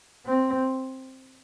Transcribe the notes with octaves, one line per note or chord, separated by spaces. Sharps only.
C4